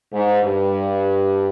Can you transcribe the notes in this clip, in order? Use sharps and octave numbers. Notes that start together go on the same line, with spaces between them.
G#2
G2